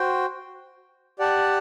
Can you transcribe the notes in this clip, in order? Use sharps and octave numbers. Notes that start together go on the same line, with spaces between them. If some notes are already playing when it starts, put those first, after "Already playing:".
Already playing: F#4 C5 G5
G4 D5 F#5 A5